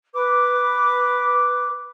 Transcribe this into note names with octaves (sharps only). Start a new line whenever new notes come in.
B4 D6